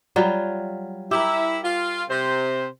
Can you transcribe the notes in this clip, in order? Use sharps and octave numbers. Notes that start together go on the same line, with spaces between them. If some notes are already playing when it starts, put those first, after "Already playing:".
F#3 G3 F4
E4 G4 A#4 E5
F4
C3 C5